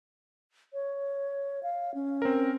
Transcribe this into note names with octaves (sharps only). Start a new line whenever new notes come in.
C#5
F5
C#4
C4 A#4